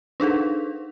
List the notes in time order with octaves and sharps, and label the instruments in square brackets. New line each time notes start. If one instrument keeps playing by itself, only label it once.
[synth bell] D4 D#4 G#4 A4